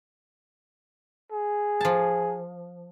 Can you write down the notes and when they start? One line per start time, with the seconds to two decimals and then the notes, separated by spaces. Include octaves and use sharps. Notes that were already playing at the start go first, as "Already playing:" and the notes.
1.32 G#4
1.81 F3 A5